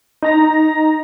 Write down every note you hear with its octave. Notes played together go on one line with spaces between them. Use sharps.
D#4 A#5 A#6